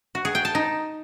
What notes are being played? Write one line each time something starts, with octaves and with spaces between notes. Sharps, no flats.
F#4
G#4
G5
A5
D#4